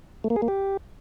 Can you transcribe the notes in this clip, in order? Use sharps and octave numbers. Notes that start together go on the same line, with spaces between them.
A3
A#3
G#4
A#3
G4